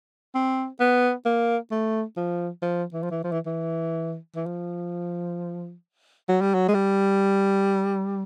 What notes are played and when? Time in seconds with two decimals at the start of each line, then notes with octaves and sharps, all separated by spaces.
0.35 C4
0.80 B3
1.25 A#3
1.71 A3
2.17 F3
2.62 F3
2.93 E3
3.03 F3
3.10 E3
3.24 F3
3.32 E3
3.46 E3
4.36 E3
4.46 F3
6.29 F#3
6.41 G3
6.54 F#3
6.68 G#3
6.74 G3